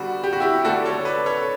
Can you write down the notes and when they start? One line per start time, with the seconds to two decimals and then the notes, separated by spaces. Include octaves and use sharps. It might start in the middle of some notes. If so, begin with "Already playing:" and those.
Already playing: D3 G3 B3 D4 F#4
0.24 G4
0.33 F#4
0.40 E4 G4
0.65 D3 A3 D4 F#4 A4
0.85 A4 C#5
1.05 B4 D5
1.26 A4 C#5